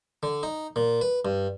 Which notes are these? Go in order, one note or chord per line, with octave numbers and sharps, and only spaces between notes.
D3
D#4
A#2
B4
G2